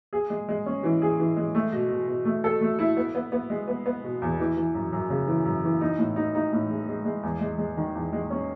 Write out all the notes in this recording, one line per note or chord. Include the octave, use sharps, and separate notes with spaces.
G#4
G#3
G#3
C#4
E3
G#4
E3
G#3
A3
B2
B2
B2
A3
A4
A3
E4
B3
B3
B3
G#3
B3
B3
B2
E2
E3
E3
F#2
F#2
C#3
E3
F#2
E3
D#4
A2
D#4
D#4
A2
G#3
G#3
G#3
E2
G#3
G#3
D#3
E2
G#3
C#4